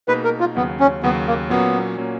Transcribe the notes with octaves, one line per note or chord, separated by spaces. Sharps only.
B2 A#3 D#4 G#4 B4
A#4
F4
D#2 C#3 F#3 B3
C#4
D#2 C#3 F#3 B3
A#3
A#2 F#3 A#3 B3 C#4 F#4
A#2 F#3 A#3 C#4 F#4